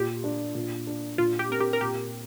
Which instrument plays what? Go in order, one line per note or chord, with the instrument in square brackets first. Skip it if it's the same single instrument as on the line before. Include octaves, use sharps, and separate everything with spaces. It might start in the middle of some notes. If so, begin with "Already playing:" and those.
Already playing: [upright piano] A#2 [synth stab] G4
[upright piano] D4
A#2
D4
[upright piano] A#2 [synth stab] F4
[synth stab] G4
[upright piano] C4 [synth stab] A#4
[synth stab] G4
A#4
[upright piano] A#2 [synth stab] G4